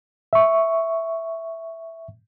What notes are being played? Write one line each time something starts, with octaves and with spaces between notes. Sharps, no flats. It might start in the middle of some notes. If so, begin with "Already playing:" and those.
E5 C#6